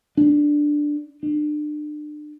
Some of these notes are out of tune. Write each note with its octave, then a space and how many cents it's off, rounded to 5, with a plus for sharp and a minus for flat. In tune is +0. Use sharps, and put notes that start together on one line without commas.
D4 +5
D4 +35